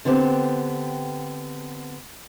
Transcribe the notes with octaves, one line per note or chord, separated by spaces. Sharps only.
D3 B3 C4 G4